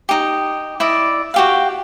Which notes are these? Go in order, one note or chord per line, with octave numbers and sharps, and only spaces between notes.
D#4 G4
E4 D5 D#5
F#4 G4 F5